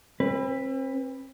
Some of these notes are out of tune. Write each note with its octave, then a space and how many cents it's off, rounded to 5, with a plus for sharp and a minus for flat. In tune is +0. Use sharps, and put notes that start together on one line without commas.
C4 +40 B4 +0